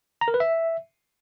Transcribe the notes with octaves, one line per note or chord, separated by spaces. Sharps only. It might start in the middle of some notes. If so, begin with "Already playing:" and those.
A#5
A#4
B4
E5